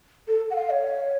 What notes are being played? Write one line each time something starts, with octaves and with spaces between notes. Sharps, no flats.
A4
F#5
F5
C#5